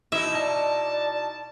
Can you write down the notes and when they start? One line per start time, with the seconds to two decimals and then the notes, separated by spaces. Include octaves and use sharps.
0.12 B2 D#4 E4 E5
0.35 D5 A5